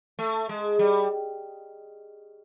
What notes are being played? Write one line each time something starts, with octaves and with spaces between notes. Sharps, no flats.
A3
G#3
G3